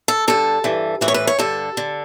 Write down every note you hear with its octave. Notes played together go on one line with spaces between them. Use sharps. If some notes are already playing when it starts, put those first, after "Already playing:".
A4
G2 D3 A4
G2 E3
A2 E3 F#4
C#5
B4
C#5
G2 D3 A4
D3